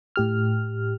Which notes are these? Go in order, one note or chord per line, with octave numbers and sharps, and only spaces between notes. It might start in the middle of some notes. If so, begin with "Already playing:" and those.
A2 G4 F6